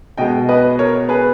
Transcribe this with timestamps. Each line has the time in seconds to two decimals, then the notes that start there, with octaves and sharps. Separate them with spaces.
0.17 B2 G#3 D#5 G5
0.49 B4 D#5
0.79 A#4 C#5
1.09 G#4 B4